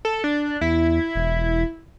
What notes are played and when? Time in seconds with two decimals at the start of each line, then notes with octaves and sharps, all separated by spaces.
0.05 A4
0.24 D4
0.61 E2 E4
1.16 E1